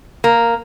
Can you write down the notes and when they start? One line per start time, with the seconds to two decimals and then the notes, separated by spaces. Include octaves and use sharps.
0.24 A#3